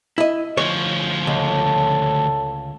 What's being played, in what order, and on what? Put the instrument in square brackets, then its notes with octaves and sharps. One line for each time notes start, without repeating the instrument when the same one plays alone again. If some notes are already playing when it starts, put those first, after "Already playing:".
[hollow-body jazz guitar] E4 D#5
[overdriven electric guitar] D2 F3 [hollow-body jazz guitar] C#5
[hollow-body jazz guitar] C#2 [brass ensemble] A4 C#5 A5